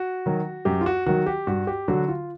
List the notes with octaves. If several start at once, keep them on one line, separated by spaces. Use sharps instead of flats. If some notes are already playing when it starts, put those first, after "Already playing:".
Already playing: F#4
D#3 F#3
F#2 G4
F4
F#4
D#3 F#3 F#4
G4
G2 F#4
G4
D3 F#3 F#4
F4